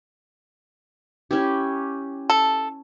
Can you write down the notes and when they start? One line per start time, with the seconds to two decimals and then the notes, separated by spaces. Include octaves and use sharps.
1.31 C#4 E4 G4
2.30 A4